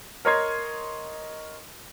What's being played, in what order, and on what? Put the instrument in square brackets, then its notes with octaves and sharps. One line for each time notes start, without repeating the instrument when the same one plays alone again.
[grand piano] A#4 C#5 D#5 A#5 C6 G#6